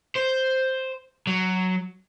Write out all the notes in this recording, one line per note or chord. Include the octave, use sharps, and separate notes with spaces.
C5
F#3